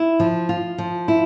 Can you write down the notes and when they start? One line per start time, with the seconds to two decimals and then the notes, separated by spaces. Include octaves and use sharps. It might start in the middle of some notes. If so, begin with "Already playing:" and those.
Already playing: E4
0.20 F3
0.49 F4
0.78 F3
1.08 E4